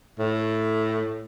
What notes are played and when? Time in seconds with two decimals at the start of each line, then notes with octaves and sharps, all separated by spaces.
0.19 A2